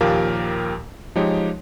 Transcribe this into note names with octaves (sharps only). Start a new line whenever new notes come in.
D#2 A#2 F3 G4 A#4 F5
F3 G#3 D#4 G4 C#5